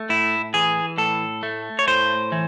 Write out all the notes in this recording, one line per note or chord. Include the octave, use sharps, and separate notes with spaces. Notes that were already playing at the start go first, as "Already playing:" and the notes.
Already playing: A3
A2 E4
E3 G#4
A2 A4
A3
C#5
A2 C5
E3